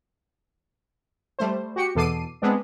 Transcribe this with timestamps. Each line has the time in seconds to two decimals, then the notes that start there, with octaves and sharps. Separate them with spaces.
1.39 G3 A3 C5
1.76 F#4 G4 C#7
1.95 E2 B2 A4 D6 C7 D#7
2.42 G#3 B3 C4 D4